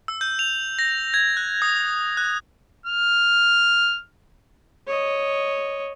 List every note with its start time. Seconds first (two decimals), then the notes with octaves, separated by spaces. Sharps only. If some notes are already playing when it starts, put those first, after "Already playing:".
0.08 E6
0.21 G6
0.39 F7
0.79 A#6
1.14 G#6
1.37 F#6
1.62 D#6
2.17 F#6
2.86 F6
4.87 C#5 D#5